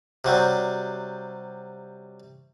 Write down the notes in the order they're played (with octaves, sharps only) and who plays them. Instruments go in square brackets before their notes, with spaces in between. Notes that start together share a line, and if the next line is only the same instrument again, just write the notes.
[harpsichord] C3 F#3 G3